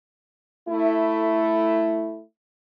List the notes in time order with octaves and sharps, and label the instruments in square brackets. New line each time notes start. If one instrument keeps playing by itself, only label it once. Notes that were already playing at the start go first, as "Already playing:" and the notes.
[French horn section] A3 E4